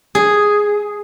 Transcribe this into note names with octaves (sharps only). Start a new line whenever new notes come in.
G#4